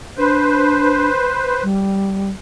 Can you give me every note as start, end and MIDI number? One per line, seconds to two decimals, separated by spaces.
0.18 1.10 62
0.18 1.64 71
0.18 1.64 72
1.63 2.30 55